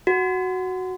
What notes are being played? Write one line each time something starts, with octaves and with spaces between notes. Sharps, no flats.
F#4